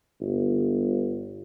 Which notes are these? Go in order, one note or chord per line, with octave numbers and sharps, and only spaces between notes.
G1